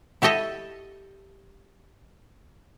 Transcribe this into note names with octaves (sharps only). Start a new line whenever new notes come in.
E4 G4 A4 D#5 E5